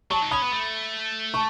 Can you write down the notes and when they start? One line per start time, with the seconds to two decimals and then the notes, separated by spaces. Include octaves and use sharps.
0.11 F#3 A5 C#6
0.22 D#4
0.31 C#4 B5 D#6
0.42 B3
0.52 A3
1.34 A5 C#6